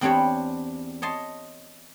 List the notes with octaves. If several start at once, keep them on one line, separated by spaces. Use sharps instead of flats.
E2 C4 D4 G4 C#5 B5
C#5 D#5 A5 C6